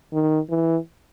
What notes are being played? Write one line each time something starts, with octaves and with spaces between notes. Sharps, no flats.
D#3
E3